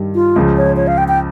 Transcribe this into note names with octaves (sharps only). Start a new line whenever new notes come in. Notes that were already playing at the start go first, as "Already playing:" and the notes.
Already playing: G2 D#3 G3
F4
C#2 C#3 F3
C#5
C#5
F5
G5
G5